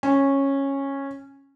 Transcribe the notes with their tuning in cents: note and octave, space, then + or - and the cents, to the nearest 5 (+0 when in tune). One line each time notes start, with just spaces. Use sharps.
C#4 -10